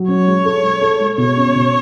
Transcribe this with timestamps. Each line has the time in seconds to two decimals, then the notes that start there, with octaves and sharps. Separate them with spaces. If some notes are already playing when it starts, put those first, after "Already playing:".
Already playing: F#3
0.08 C#4 C#5
0.27 G#3
0.45 A4
0.63 G#3
0.81 A4
1.00 G#3
1.18 B2 C#5
1.37 C#4
1.55 B2